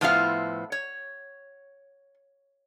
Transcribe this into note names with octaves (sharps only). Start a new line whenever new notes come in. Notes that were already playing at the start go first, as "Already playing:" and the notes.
A2 F3 B3 E4 F4 F5
C#5